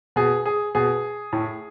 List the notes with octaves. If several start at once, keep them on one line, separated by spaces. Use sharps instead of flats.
B2 G#4
G#4
B2 G#4
A2